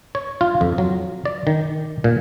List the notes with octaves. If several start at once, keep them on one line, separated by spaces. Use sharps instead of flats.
C#5
F4
F2
F#3
D5
D#3
A#2